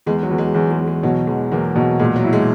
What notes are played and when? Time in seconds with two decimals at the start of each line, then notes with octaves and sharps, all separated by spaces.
0.06 E2 G#3
0.23 F#3
0.31 E2
0.38 G#3
0.54 E2 F#3
0.71 G#3
0.79 E2
0.87 G#3
1.03 B2 F#3
1.27 E2 G#3
1.52 E2 F#3 A#3
1.76 B2 F#3
1.99 A#2 G#3
2.16 F#3
2.24 E4
2.33 G#3